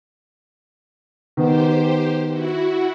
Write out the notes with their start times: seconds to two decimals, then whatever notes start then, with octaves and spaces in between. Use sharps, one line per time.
1.37 D#3 B3 G4 C5
2.31 E4 F#4